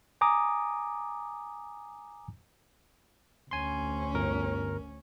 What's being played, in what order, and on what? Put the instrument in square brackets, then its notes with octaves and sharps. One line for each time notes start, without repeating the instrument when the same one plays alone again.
[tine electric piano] G#5 A#5 D6 D#6
[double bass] D2 C#4 [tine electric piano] G#5 C6
[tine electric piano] G1 A#4